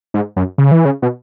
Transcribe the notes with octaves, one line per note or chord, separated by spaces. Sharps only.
G#2
F#2
C#3
E3
C#3
B2